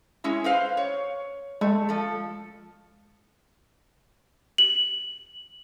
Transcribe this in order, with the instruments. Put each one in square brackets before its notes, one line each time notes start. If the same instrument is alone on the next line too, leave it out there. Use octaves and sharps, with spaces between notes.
[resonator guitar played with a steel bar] G#3 C#4 E4
B4 C5 F5
C#5
[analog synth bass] G#3 [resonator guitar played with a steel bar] A3
[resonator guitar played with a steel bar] F3 A4
[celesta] F#7